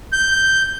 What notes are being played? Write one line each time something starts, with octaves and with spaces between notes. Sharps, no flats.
G6